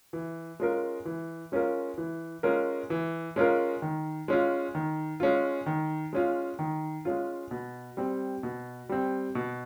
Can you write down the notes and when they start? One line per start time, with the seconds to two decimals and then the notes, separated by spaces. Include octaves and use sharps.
0.13 E3
0.60 G#3 C#4 F4 A#4
1.05 E3
1.52 G#3 C#4 F4 A#4
1.98 E3
2.43 G#3 C#4 F4 A#4
2.90 E3
3.36 G#3 C#4 F4 A#4
3.82 D#3
4.28 G#3 C#4 F4
4.75 D#3
5.20 G#3 C#4 F4
5.66 D#3
6.13 G#3 C#4 F4
6.59 D#3
7.05 G#3 C#4 F4
7.51 B2
7.97 G3 C4
8.43 B2
8.89 G3 C4
9.35 B2